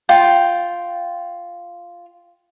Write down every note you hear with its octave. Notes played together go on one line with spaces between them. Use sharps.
F4 G5